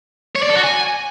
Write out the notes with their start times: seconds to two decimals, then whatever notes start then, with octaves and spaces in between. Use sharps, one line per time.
0.36 C#5
0.43 D5
0.50 A4
0.57 F#4
0.64 G#5